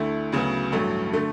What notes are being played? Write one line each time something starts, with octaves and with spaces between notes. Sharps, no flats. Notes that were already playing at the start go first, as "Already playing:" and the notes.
Already playing: D2 D3 A3 E4
D2 C#3 F#3 B3
A1 G2 F#3 A3
D3 A3